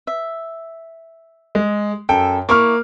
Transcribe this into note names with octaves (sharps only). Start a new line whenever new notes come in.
E5
G#3
F#2 A4 G5
A#3 E4 C#6 D6 F6